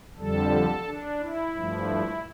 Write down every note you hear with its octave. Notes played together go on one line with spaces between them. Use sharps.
F2 D3 G3 A4
D4
E4
G2 F3 A3